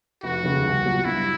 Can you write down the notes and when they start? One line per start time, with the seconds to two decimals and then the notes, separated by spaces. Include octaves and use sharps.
0.23 F1 F#4
0.44 D#2 C#3
0.64 C2
0.85 A#2 F#3
1.05 G2 E4